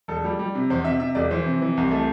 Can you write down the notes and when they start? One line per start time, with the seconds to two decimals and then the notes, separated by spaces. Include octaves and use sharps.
0.08 E1 A4
0.24 G3
0.39 G3
0.55 C3
0.70 E2 C5
0.85 C3 E5
1.00 C3 E5
1.15 E1 D5
1.31 E3 C5
1.46 C3
1.62 E3
1.77 C2
1.91 A3 A4